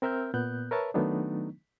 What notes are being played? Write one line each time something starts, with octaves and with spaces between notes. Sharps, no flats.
C4 A#4 E5 F6 G6
A#2 B3 F#6 G6
A#4 B4 C#5 E5 A5
D#3 F#3 A3 B3 D4 D#4